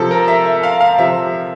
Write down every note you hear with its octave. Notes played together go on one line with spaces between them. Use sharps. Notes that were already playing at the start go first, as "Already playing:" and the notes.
Already playing: C3 F3 A4
A#4
E5
E5
F5
F5
C3 F3 E5